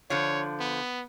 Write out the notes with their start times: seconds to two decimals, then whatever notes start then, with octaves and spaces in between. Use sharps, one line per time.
0.10 D3 F3 C#5
0.60 B3